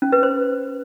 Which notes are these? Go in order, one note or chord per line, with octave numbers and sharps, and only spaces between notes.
C#4
B4
C5